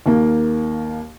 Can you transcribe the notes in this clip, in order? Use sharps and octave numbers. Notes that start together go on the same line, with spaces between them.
D#2 A#3